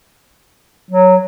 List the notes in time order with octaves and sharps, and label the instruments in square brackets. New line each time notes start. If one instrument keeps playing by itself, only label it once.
[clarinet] F#3